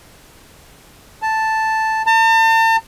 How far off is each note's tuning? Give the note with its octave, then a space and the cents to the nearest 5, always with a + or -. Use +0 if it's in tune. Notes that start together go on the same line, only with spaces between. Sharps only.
A5 +0
A5 +40